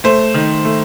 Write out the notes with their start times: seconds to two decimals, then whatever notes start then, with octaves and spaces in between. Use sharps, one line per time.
0.04 A3 C5
0.34 D#3
0.65 A3